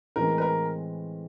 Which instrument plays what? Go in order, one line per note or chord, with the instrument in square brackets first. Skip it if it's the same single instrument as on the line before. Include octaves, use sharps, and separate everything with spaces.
[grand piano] A2 E3 G#3 C4 [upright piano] A#4
[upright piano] B4
A#4